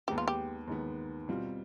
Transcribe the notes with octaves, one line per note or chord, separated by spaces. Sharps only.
D#2 D#3 G#3 B3 G4
F4
G4
D#2 D#3 G#3 B3
B2 G3 C4 F4